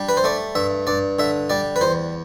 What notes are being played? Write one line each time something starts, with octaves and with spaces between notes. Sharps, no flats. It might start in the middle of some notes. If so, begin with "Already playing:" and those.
Already playing: G3 D4
B4
C5
A3 D5
G2 E5
G2 D5
D3 E5
G3 D5
B4
E2 C5